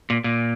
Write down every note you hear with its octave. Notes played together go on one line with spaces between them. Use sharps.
A#2
A#2